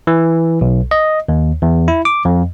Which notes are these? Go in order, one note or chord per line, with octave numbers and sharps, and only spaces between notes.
E3
B1
D#5
D#2
E2
E4
D6
F2